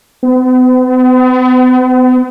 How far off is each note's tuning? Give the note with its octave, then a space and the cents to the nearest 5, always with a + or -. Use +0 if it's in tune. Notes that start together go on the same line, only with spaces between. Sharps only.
B3 +45